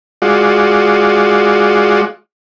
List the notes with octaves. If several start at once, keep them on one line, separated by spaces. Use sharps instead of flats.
G#3 F4 F#4 D5